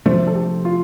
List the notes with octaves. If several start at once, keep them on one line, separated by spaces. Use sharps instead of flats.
C3 F3 A3 D4 C5
A4
G4
F4